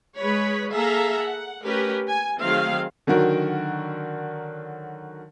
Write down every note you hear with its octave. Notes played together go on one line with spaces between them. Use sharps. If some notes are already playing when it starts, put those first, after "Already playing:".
G#3 B4 C#5 B5
A#3 G#4 A4 E5 F5 A#5
F#5
A3 C#4 G4 A#4 B4
G#5
D#3 F#3 A3 C4 G#4 F5
D3 D#3 F#3 F#4 A#4